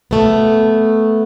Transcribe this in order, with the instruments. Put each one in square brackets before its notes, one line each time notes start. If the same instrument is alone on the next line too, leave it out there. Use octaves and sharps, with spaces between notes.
[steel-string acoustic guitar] A3 B3